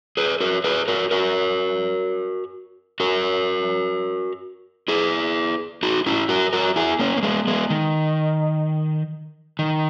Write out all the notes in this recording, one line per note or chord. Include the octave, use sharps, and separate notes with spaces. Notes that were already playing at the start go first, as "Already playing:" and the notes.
G#4 B4
F#4 A#4
G#4 B4
F#4 A#4
F#4 A#4
F#4 A#4
E4 G#4
D#4 F#4
C#4 E4
F#4 A#4
F#4 A#4
E4 G#4
A#3 C#4
A#3
G#3 B3
G#3 B3
D#3
D#3